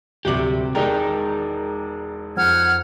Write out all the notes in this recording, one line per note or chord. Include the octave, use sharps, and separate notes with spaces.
D1 C3 E3 G3 F#4 G4 D6 F#7
E1 G#3 D#4 A#4 D5 G5
F2 F#5 F6 G#6